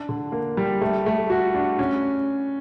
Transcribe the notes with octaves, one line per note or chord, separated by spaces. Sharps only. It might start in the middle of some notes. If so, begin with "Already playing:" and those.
Already playing: D4
D3
A#3
G3
A3
A3
F#4
D4
C#4